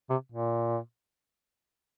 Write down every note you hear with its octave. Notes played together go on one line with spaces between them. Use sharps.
C3
A#2